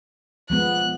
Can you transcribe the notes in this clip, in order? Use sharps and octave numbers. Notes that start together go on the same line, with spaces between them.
F3 G#3 B3 F#6